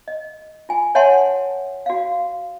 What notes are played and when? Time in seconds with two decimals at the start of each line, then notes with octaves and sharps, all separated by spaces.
0.08 D#5
0.69 F4 G#5
0.95 C#5 E5 F#5 G#5 A5 C6
1.86 F#4 F5